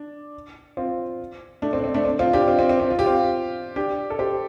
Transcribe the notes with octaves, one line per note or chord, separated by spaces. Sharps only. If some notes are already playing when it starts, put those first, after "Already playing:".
Already playing: D4
C4 F4
A3 D4
C4
D4
C4
A3 D4
C4
C4 F4
D4 G4
C4 F4
C4
C4
C4
F4
G4
C4 F4
D4 G4
A4
G4 C5